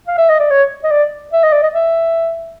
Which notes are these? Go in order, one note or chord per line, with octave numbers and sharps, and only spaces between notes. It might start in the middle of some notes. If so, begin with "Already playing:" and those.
F5
E5
D#5
D5
C#5
D#5
D5
E5
D#5
D5
D#5
E5